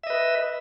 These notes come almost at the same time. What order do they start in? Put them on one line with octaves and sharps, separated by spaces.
E5 D#5 B4